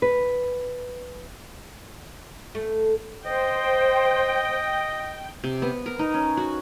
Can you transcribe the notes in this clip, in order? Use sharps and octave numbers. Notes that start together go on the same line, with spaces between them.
B4
A3
C5 D#5 G5
C3
B3
A#4
D#4
C#4
F#4